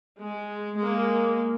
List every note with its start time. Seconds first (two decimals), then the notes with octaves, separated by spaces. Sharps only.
0.20 G#3
0.78 G#3 A#3